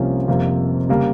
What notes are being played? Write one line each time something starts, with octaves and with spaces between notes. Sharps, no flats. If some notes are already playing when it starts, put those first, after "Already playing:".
Already playing: C2 C3 F3 A#3 C#4
F1 F2 C3 G3 A#3
C#3 G3 A#3